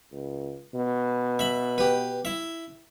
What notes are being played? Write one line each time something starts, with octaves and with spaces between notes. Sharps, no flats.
C#2
B2
E5 B5
G4 B4
E4 E5